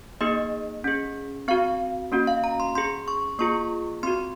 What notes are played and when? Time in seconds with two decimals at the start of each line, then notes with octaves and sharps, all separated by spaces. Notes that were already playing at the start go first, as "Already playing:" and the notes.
0.21 A#3 D#4 G#4 D#5
0.84 C#4 G#4
1.48 C4 F#4 F5
2.12 A#3 C#4 F#4
2.27 F5
2.44 A#5
2.60 C6
2.75 C#4 G#4 C6
3.08 C#6
3.39 A#3 F4 G#4 C#6
4.03 C4 F#4 C6